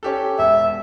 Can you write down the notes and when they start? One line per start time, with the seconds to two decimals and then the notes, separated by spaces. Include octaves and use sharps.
0.03 C#4 G4 A4
0.39 E1 E5